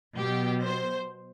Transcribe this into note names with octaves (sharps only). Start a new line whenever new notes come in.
B2 F#3 G4
C5